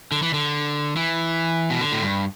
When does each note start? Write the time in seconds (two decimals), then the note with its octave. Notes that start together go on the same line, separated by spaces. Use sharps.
0.12 D3
0.22 E3
0.34 D3
0.96 E3
1.70 B2
1.81 D3
1.92 A2
2.02 G2